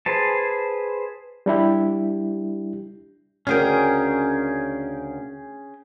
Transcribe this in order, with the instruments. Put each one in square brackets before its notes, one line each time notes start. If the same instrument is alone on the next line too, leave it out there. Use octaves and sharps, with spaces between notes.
[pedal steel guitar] G#4 B4 C5 A5
[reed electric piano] G3 D4 E4 G4
[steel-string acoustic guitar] D2 C#3 A#4 [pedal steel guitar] C#4 G#4 G5